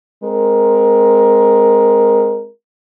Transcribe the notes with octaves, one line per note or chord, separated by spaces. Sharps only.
G#3 C4 A#4